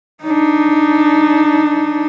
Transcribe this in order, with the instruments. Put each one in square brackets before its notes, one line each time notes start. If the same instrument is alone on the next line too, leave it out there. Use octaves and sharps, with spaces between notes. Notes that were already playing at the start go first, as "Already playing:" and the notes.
[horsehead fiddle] D4 D#4